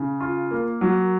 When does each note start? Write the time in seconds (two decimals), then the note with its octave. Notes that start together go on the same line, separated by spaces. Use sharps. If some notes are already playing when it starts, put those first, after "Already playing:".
Already playing: C#3
0.20 F4
0.51 A#3
0.81 F#3